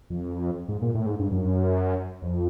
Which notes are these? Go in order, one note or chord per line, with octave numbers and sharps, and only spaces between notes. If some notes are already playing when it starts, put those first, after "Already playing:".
F2
G#2
A#2
A2
G#2
G2
F#2
F2